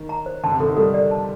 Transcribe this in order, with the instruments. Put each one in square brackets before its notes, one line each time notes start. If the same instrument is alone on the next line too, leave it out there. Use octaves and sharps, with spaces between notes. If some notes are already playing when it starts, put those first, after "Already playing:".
Already playing: [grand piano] D#3
[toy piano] A#5
C5
[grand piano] D3 [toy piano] A5
[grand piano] C3
[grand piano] D3 [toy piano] A4
[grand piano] D#3
[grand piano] G3 [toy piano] A4
[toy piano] D5
A5